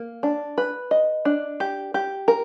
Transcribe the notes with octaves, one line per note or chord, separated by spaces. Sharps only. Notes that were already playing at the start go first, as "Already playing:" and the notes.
Already playing: A#3
D4
B4
D#5
D4
G4
G4
A#4